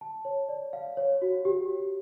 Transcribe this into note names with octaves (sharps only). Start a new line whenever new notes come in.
A5
C#5
D5
F5
C#5
F#4
G4